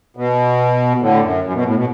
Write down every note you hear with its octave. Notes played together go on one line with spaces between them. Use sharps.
B2
A2 D3
F#2
F#2
B2
A2
B2